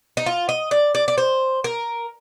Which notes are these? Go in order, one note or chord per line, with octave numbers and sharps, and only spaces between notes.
D#4
F4
D#5
D5
D5
D5
C5
A#4